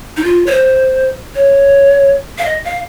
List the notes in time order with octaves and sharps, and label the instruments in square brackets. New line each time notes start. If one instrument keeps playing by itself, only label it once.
[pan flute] D#4
F4
C#5
C5
C#5
F5
D#5
F5